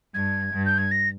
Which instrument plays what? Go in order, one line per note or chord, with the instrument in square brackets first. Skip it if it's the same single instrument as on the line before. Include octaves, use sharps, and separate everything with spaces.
[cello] G2 [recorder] G#6
[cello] G2
[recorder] G6
G#6
A#6